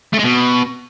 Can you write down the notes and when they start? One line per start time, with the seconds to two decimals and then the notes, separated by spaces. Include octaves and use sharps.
0.13 A3
0.19 G#3
0.24 B2